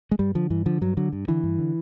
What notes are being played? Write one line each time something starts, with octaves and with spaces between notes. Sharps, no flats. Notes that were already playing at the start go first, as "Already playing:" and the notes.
G#3
G2 G3
D3 F3
G2 E3
D3 F3
G2 F#3
D3 F#3
G2
D3 E3
G2
D3